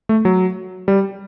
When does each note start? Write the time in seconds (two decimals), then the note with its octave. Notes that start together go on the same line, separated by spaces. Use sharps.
0.09 A3
0.25 F#3
0.88 G3